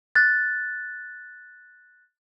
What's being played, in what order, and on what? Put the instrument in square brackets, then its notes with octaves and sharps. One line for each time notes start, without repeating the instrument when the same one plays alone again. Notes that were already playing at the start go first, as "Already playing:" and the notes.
[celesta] F#6 A6